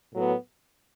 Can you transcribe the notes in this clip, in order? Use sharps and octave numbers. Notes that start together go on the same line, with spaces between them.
A2 F#3 B3